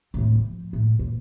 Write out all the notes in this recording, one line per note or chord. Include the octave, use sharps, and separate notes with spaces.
F2 A2
F3
A2
A#2